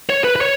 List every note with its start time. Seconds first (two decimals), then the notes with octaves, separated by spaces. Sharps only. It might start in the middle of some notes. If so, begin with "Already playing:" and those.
0.10 C#5
0.24 B4
0.36 B4
0.41 C#5